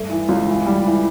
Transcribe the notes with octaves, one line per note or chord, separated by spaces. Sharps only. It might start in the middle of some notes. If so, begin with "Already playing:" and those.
Already playing: G2 A3
E3
C#2
E3
G3
E3